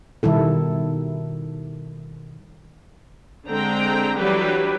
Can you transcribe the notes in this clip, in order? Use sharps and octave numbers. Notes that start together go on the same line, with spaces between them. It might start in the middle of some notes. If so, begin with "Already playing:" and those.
B2 D#3 G3 E4 A4
D3 G#3 C4 G5 A#5
E3 F#3 G3 D4 G4 B4